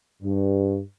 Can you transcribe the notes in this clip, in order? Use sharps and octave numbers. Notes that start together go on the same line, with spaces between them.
G2